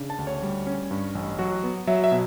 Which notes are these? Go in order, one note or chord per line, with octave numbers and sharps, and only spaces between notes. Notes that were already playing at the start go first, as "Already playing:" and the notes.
Already playing: C#3 D4
A5
D2
C#5
G3
C#4
G2
A1
F#3 F#4
B3
F#3 E5
E5
B2